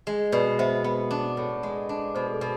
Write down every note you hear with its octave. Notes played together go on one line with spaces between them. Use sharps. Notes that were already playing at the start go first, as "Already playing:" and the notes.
G#3
B2 B4 D5
B3 C5 E5
B3
D4
A2
G#3
D4
B2 C5
G#4
A4
B2